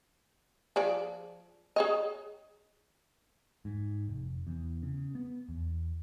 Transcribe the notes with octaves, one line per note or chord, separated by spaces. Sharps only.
F3 G#4 D5
G#4 C#5 D#5
G#2
F1
E2
C#3
B3
E2